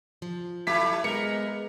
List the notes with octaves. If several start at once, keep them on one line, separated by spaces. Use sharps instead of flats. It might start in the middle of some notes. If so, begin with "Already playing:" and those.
F3
F#3 A3 E4 B6
G#3 B3 A#4 C#7